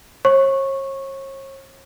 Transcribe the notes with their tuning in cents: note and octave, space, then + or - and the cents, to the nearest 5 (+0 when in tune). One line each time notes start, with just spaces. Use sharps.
C#5 -40 C#6 -10